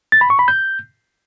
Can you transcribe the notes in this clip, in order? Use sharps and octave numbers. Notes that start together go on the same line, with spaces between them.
A6
B5
C#6
B5
G6